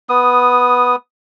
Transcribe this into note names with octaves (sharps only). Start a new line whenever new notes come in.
B3 D#6